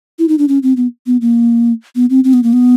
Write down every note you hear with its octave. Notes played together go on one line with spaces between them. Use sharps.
E4
D#4
D4
C#4
C4
B3
B3
A#3
B3
C4
C4
B3
A#3
B3